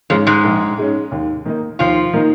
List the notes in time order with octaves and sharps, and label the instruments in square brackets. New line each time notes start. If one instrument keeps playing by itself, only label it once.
[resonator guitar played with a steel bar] F2 F3 [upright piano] G#2 G#3 C#4
[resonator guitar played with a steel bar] G#2 G#3
[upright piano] A#1
G#2 G#3 C#4
D#2
D#3 A#3 D#4
[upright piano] D#2 [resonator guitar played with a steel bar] F3 F4
[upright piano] D#3 A#3 D#4